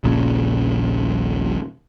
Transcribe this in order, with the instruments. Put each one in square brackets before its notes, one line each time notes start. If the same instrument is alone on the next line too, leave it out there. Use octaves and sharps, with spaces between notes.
[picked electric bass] D#1 A#1 A#2 C#3